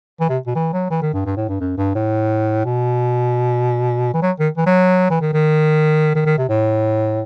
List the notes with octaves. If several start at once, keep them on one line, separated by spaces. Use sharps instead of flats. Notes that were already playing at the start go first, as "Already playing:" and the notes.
E3
C3
B2
E3
F#3
E3
D#3
G2
G2
A2
G2
F#2
G2
A2
B2
E3
F#3
D#3
E3
F#3
E3
D#3
D#3
D#3
D#3
C3
A2